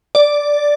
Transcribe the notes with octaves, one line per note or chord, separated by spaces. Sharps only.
D5